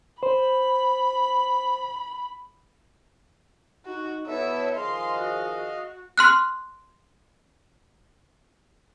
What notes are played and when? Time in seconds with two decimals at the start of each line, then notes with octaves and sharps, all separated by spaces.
0.23 C5 B5
3.86 D#4 F#4
4.27 B2 B3 E4 F#4 A4 C#5 E5
4.76 D#3 F3 G#4 D#5 F5 C6
5.19 F#4
6.18 C6 F6 F#6